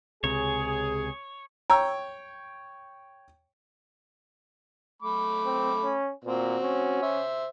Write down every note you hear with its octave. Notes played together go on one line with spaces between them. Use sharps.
C#2 C3 G#4 C#5
C#5 G5 A#5 E6
A3 B5 D6
C4
C#4
A#2 C4 F#4
C#4
C5 E5